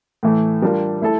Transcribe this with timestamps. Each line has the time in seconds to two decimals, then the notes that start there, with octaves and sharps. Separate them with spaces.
0.23 A2 E3 A3
0.62 G3 D4 F4 A#4
1.01 A3 E4 A4